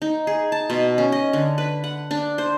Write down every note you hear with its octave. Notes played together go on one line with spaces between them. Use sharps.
D#4
G#4
A5
B2
C#4
D#5
D3
B4
F#5
D4
C5